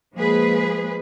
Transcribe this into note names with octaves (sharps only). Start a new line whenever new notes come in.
F3 G#3 A#3 G#4 B4